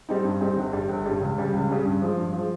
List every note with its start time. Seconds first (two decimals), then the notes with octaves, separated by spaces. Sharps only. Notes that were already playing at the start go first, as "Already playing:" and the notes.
0.09 G3 C4 D#4
0.25 G2
0.41 G3 C4 D#4
0.56 G1
0.73 G2 G3
0.89 G1
1.05 G2 G3
1.21 C#2
1.37 C#3 G3 C#4
1.53 C#2
1.69 C#3 G3 C#4
1.85 G2
2.02 F3 G#3
2.18 G2
2.33 F3
2.38 G#3